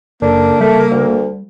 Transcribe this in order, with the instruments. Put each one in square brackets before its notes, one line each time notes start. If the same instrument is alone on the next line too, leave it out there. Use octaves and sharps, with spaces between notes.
[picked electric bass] F#1 [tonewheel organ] C#3 A4 [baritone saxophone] A#3 [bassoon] D4
[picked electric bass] G3 [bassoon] A3
[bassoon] D2